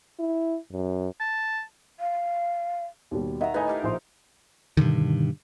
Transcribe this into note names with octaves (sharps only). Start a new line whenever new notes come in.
E4
F#2
A5
F5
D#2 B2 G3
D#3 D#5 E5 F#5 A#5
A2 D#4 B4 D#5 G#5
G4 A#4 F5
A#1 C5 C6
G2 B2 D3 D#3